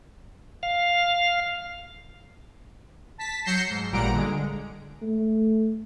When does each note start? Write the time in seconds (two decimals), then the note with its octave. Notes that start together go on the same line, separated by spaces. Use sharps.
0.63 F5
3.18 A5 B6
3.44 F#3 G6 A#6 C7 C#7 E7
3.70 G#2
3.91 A1 A#2 G3 F#5 A#5 D7
4.13 D3 G#3
5.02 A3